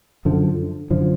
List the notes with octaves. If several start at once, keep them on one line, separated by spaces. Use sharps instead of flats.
F#2 D3 F3
F#2 D3 F3